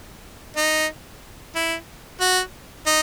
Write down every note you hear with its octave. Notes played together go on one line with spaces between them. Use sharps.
D#4
E4
F#4
D#4